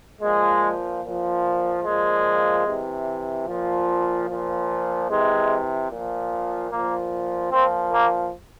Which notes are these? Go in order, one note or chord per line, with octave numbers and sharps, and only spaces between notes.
A#2 F3 G#3
A#2 F3
A#2 F3 G#3
C3 E3
A#2 F3
A#2 F3
C3 E3 G#3
A#2 F3
A#2 F3 A#3
A#2 F3 C4
A#3